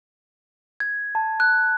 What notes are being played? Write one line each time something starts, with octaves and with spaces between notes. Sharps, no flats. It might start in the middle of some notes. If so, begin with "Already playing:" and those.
G#6
A5
F#6